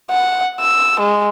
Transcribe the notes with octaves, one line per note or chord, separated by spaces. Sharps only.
F#5
E6
G#3